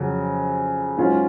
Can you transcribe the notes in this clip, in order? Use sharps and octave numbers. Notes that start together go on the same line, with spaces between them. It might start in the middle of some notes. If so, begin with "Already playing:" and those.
Already playing: F2 C#3 F#3
G#2 F#3 C#4 F4